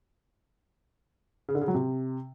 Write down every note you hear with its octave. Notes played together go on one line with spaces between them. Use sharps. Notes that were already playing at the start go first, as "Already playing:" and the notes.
C#3
D3
C#3
F#3
C3